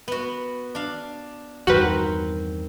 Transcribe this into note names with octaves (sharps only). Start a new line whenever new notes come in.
B3 F#4
D4 F5
E2 G2 D#3 C4 F#4 A#4 B4